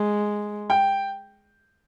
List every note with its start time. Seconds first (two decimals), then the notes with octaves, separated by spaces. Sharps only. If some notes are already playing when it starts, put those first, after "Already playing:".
Already playing: G#3
0.70 G5